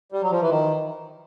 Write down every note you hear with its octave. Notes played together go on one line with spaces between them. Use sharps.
G3
F#3
F3
E3
D#3